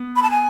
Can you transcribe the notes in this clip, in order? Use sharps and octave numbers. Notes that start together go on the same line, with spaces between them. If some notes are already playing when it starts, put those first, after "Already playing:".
Already playing: B3
B5
A5
G#5